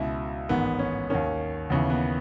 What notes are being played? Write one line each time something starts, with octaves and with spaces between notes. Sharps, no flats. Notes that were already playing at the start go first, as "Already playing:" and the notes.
Already playing: C#2 B2 E4
A1 G#2 D#3 B3
C#4
D#2 D#3 C#4
D#2 C#3 E3 B3
B3